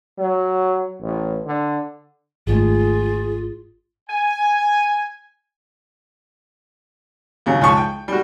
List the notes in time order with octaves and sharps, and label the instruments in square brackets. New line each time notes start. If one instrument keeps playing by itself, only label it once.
[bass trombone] F#3
A1
D3
[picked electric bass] G#1 G#2 A3 [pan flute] F4 [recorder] G#4
[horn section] G#5
[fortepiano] D#2 C#3 F#3
C#2 F3 C#5 A5 C#6
G5
G3 F#4